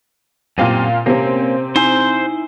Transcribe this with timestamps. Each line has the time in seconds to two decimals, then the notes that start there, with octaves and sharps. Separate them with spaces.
0.58 F#2 A#2 C4 G4 F5 D#7
1.06 C3 A#3 C4 C#4
1.76 D#4 E4 C5 G#5